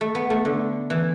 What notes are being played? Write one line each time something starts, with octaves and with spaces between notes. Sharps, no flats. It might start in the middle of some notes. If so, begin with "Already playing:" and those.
A3
B3
A3
D3
E3